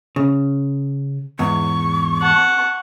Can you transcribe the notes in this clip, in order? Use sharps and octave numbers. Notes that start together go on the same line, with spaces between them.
C#3
E2 G#2 C#6
F#5 A5